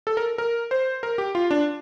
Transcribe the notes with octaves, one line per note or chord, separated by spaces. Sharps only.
A4
A#4
A#4
C5
A#4
G4
F4
D4